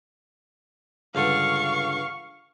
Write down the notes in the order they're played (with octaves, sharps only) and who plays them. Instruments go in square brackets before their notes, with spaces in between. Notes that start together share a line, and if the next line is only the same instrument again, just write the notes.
[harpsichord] C#2 G2 D3 [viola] F5 C#6